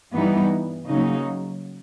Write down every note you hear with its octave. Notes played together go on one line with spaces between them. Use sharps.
G2 E3 G3 B3 D#4
C#3 F#3 A#3 D#4